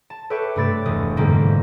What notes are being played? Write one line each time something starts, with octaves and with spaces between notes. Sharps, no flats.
A5
A4 B4 C#5 E5 G5 D6
G2 C3 A3 B5 A6 D7
E1 D#6
F2 G#2 D3 G3 A#3